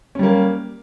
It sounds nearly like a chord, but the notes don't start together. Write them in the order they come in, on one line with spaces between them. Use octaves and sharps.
C#4 G3 A#3